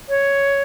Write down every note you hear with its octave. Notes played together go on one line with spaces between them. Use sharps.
C#5